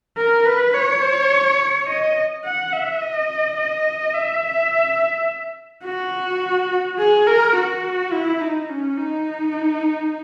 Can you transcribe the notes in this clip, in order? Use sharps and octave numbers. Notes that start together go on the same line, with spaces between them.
A#4
B4
C#5
D#5
F#5
E5
D#5
D#5
E5
F#4
G#4
A#4
F#4
E4
D#4
C#4
D#4